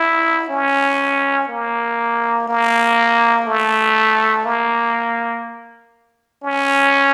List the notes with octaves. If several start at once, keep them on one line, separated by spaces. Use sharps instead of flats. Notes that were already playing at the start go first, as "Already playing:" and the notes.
Already playing: E4
C#4
A#3
A#3
A3
A#3
C#4